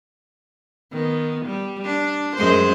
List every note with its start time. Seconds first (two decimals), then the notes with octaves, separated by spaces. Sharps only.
0.92 D#3 B3
1.46 G3
1.85 D4
2.37 F#2 G#3 C5